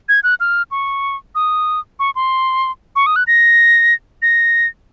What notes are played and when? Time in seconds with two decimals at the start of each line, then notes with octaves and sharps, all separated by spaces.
0.09 G#6
0.23 F#6
0.40 F6
0.71 C#6
1.35 D#6
1.99 C#6
2.15 C6
2.96 C#6
3.06 D#6
3.16 F#6
3.27 A#6
4.22 A#6